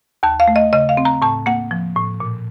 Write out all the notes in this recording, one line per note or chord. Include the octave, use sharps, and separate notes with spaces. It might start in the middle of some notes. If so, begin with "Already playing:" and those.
D#2 A5
F5
A3
D#5
C#3 D#5
F5
C4
A#5
A2 A5
A#3 F#5
F3
A2
A#2